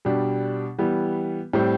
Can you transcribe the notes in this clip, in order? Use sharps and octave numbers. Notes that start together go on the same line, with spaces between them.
B2 G3 D4 G4
E3 G3 B3
A2 G3 C4